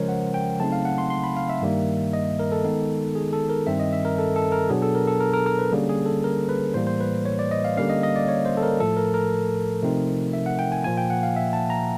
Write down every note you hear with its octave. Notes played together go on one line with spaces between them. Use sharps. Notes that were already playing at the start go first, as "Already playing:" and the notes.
Already playing: C#3 F3 G#3 C#4 A#4 C5 C#5
F#5
G5
C#3 F#3 A3 C4 D#4 A5
F5
F#5
C6
C6
B5
F5
E5
G2 D#3 G3 A#3
D#5
A#4
A4
D#3 G#3 B3 D#4
G#4
A4
A#4
G2 D#3 G3 C4 E5
D#5
E5
A#4
A4
A4
A#4
B2 F#3 B3 D4 G#4
A4
A#4
A4
A#4
A#4
A#4
B4
D3 G3 A#3 C#4 G#4
G#4
A4
A#4
B4
A2 E3 G3 A#3 C5
C5
B4
C#5
D5
D#5
F5
D3 G3 A#3 C#4 F5
D#5
D#5
D5
C#5
C5
A4
A#4
A2 F3 A3 A4
A#4
A#4
C3 F3 A3 C4 D#4
E5
F#5
G5
G#5
A#2 F3 A#3 G#5
G5
F#5
F5
E5
A5
A#5